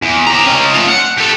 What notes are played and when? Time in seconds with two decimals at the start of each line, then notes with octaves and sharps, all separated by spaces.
0.02 E2
0.27 G4 A#5
0.46 C#4 D#5
0.73 A3 F4
0.88 F#5
1.18 G3 A4